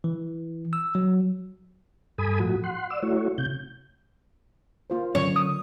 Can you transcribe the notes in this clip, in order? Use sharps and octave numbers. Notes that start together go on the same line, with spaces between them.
E3
E6
F#3
G2 A4 G#5 B5 D#6
A2 F3 F#4
F#5 C6
D5 E6
A3 E4 F#4 C#5
C3 G6
A#3 F4 C5
D3 F#3 C#4 C#5
D#6